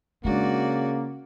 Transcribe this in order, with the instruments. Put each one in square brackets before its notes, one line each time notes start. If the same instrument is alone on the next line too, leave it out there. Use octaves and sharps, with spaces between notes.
[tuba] C#3 [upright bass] G#3 D4 [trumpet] A#3 [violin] F#4 D5